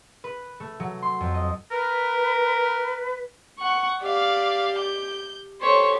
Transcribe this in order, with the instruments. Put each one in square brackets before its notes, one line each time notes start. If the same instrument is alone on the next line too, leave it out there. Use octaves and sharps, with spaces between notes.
[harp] B4
A3
F#3
C6
F2
D#5
[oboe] A#4 [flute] B4
[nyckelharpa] F#5 C#6
[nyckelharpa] G4 [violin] D5 F5
[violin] G6
[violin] G4 A4 [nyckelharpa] C5 C#5